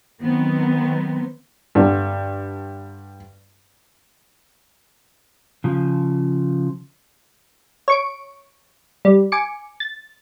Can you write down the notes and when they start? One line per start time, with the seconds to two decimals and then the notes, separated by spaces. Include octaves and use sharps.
0.21 D#3 F#3 B3 C4
1.75 G2 D3
5.64 C#3 F3
7.88 C#5 C#6 D7
9.05 G3
9.32 G#5 D6 C#7
9.80 A6